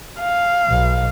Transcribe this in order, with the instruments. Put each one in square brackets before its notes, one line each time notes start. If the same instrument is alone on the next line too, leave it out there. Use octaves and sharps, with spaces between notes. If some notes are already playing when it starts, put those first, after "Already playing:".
[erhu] F5
[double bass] B1 B2